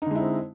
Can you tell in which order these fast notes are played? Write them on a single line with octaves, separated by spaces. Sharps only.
D#4 D3 G#3 E4 C4